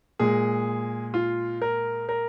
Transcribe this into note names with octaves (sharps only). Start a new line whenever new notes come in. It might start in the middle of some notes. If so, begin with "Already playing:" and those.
A#2 G#3 G#4
F4
A#4
A#4